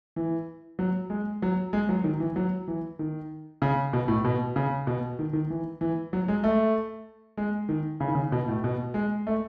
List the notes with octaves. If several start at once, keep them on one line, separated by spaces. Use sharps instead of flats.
E3
F#3
G#3
F#3
G#3
F#3
D#3
E3
F#3
E3
D#3
C#3
B2
A2
B2
C#3
B2
D#3
D#3
E3
E3
F#3
G#3
A3
G#3
D#3
C#3
D#3
C#3
B2
A2
B2
G#3
A3